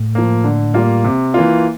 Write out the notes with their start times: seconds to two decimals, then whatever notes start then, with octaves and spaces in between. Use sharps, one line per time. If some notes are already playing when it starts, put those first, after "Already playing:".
Already playing: A2
0.15 F3 A#3
0.44 D3
0.74 G3 A#3 F4
1.04 C3
1.34 E3 A#3 F4